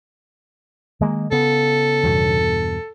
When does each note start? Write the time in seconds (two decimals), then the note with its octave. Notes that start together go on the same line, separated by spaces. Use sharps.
1.00 D#3 G#3 A#3
1.31 C#3 B3 A4
2.04 E2 G2 B2